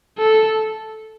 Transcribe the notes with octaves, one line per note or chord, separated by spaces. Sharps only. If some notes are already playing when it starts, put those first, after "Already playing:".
A4